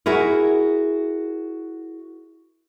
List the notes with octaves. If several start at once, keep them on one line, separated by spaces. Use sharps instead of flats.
E4 F#4 G#4 A#4